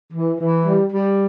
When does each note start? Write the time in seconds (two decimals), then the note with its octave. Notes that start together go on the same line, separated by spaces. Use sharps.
0.13 E3
0.39 E3
0.65 G3
0.91 G3